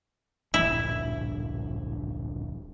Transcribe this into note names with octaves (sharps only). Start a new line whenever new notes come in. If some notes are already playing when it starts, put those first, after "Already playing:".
D1 A#1 G2 E4